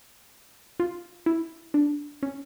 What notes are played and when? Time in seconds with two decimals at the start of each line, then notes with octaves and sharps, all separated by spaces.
0.80 F4
1.26 E4
1.74 D4
2.23 C#4